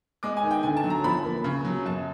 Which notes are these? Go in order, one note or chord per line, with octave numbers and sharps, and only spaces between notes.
G#3 D6
G#5
D#3
G5
D3 G#5
A5
F#3
A#5
F3 B5
A#3
C#3
F#3
F#2 A5